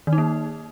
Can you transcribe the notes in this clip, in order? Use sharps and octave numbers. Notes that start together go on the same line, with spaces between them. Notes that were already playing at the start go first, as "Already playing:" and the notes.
D#3
D#4
A#3